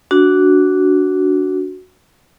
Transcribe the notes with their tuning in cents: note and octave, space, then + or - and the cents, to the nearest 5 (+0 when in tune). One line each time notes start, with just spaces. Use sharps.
D4 -15 F#4 +0